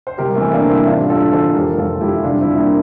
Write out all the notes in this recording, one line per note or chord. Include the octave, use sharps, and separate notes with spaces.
C5
C2 G4 A#4
A3 C4
E3
A#3 D4
C2
C4 E4
A1 D4 F4
G2 F4 A4
E3 A4 C5
F1 G4 A#4
F1 F4 A4
F1 E4 G4
C2 D4 F4
C4 E4
C2
A#3 D4